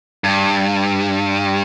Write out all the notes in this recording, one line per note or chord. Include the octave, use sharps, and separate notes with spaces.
G2